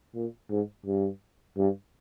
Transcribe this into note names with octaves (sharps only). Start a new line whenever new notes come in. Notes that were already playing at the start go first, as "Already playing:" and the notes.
A#2
G#2
G2
G2